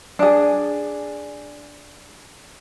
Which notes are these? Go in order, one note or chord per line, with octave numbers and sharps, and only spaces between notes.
D4 G#4